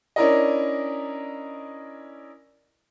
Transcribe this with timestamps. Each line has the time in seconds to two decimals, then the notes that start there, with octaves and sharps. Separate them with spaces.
0.16 C#4 D4 E4 A#4 D5 D#5